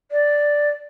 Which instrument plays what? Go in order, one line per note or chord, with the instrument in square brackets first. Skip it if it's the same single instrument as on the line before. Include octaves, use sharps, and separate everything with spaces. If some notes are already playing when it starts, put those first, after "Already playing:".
[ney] D5